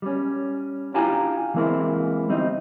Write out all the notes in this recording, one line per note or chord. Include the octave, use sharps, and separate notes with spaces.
G3 C#4
D4 E4 F4 G4 G#5 A#5
E3 G#3 A#3 C4 E4
G3 C4 D#4